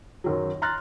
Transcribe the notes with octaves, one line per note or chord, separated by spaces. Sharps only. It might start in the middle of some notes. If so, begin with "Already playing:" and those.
F#2 D#3 F#3
A#5 C6 F6 F#6 A6 A#6